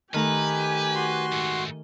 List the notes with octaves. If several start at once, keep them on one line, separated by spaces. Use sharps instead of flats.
D#3 A3 G4 B4 G#5 A#5
F#4 C6
G#2 A3